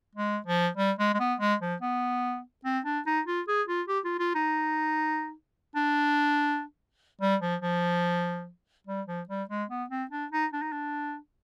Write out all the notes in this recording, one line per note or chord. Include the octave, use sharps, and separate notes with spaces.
G#3
F3
G3
G#3
G#3
B3
G#3
F3
B3
C4
D4
D#4
F4
G#4
F4
G4
F4
F4
D#4
D4
G3
F3
F3
G3
F3
G3
G#3
B3
C4
D4
D#4
D4
D#4
D4